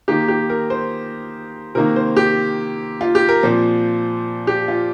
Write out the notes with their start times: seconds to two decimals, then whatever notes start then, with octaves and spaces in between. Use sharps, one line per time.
0.08 D#3 A#3 D#4 G4
0.28 G4
0.50 A#4
0.70 C5
1.75 C3 D#3 A#3 A#4
1.96 C5
2.17 G4
3.01 F4
3.15 G4
3.29 A#4
3.43 A#2 F3 C4
4.47 G4
4.68 F4